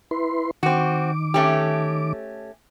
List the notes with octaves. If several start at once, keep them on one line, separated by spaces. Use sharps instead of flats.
E4 B4 C6
D#3 C4 F#4 D6
A3 C#4 G4